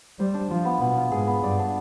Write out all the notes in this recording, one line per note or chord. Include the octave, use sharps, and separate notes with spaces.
G3 C5
D4
F3 F4
B3
B2 B3
F4
G#2 G#4
B3
G2 D5
D4